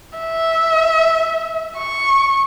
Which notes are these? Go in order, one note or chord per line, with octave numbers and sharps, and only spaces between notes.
E5
C#6